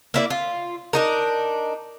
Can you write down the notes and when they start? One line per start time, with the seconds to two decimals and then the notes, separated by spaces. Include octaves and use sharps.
0.14 A#3 E4 D5
0.30 F4
0.93 D4 D#4 A#4